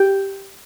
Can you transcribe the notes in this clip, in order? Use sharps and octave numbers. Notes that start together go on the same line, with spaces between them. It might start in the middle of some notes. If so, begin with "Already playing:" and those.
Already playing: G4